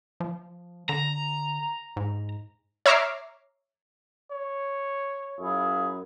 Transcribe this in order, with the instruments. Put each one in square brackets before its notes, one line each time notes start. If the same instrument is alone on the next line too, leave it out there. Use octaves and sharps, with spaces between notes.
[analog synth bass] F3
[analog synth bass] D3 [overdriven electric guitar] A#5
[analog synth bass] G#2
[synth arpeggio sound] C#5 E5 A#5 D6 F6 C7
[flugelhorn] C#5
[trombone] F#2 [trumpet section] E4 F4 G#4